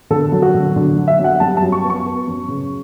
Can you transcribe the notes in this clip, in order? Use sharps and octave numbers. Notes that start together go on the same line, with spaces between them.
D3 A4
F#3
F#4
D3
D3
F#3
E5
F#3 F#5
G3 A5
A5
F#2
C#6
B3
C#6
B3
F#2
C#3